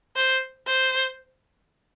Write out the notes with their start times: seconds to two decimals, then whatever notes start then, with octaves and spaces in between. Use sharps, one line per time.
0.16 C5
0.68 C5